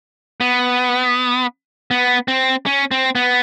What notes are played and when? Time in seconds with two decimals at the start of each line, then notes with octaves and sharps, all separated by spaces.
0.41 B3
1.91 B3
2.28 C4
2.66 C#4
2.91 C4
3.15 B3